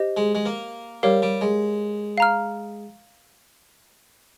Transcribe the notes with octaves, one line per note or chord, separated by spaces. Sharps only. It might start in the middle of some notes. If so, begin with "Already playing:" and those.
Already playing: G4 C5 D#5
G#3
G#3
A#3
G3 G4 A#4 C#5 F5
G3
G#3
F5 A#5 F6